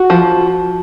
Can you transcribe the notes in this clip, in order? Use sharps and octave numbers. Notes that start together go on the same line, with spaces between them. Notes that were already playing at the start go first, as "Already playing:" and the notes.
Already playing: F#4
F3